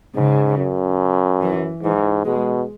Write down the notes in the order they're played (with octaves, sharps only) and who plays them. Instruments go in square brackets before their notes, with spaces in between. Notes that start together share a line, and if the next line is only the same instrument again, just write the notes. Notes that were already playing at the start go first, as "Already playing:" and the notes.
[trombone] G#2 [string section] C#3
[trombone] F#2
[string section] E3
[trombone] G#2 [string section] E3
[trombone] B2 [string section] G#3